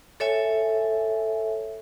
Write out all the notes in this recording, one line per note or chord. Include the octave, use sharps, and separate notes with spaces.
A4 C#5 E5 G#5